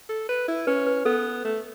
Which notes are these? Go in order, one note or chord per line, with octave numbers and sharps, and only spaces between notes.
A4
B4
E4
C#4 B4
B4
B3 A4
A3